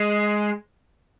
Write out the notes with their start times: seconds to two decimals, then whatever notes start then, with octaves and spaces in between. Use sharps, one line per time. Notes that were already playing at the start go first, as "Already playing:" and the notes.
Already playing: G#3